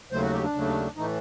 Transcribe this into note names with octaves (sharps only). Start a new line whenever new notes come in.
D#2 C#3 F#3 A3 C5
F#4
G4
D4
D#2 C#3 F#3 A3
A2 E3 A3 D#4